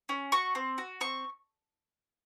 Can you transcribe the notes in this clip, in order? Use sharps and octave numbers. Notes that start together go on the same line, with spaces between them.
C#4
F#4 C#6
C4
F#4
C4 C#6